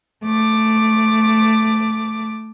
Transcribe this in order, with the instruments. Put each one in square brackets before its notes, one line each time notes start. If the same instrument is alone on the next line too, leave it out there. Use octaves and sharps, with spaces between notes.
[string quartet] A3 D6